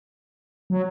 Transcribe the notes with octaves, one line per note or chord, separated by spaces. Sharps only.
F#3